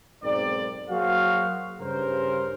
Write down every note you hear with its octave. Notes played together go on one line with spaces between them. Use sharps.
B1 G#2 C4 A#4 D5
F#3 A#3 F#4 G#4 C5 F5
G2 C#3 A#4 C5